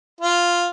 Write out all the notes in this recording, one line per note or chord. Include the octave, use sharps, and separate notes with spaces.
F4